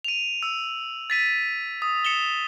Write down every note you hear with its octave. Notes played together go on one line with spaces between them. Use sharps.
D#7 F7
E6
A6 B6 D#7
D#6
C#7 E7 G7